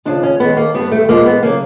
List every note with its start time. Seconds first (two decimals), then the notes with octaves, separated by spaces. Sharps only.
0.05 D#2 C#3 F3 D4
0.23 C#4
0.39 D#2 D#3 G#3 B3
0.57 A#3
0.74 G2 D3 G3 B3
0.91 A3
1.08 A#2 F3 G#3 A#3
1.25 B3
1.43 C#3 F#3 A#3